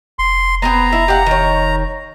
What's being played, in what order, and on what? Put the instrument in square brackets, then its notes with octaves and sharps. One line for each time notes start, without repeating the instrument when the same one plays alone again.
[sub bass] F1 [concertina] C6
[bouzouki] B3 C4 G#4 [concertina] A#5
[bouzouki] E4
G4 F5 F#5
D#3 C#5